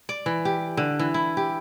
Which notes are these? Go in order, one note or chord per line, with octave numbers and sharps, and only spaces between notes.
D5
E3
G4
D3
E3
E4
G4